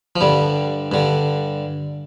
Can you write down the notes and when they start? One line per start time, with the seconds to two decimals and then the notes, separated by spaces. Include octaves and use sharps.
0.16 F3
0.21 G2 D3 G3
0.92 G2 D3